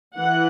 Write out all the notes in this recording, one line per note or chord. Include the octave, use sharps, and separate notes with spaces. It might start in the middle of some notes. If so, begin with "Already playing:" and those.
E3 F#5